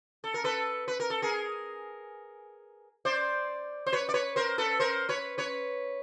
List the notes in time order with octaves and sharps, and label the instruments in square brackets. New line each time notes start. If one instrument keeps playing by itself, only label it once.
[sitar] A4
A#4
A4 B4
B4
A#4
A4
G#4 A#4
C5 D5
C5
B4 C#5
D5
B4 C#5
A#4 C5
A4 B4
A#4 C5
B4 C#5
B4 C#5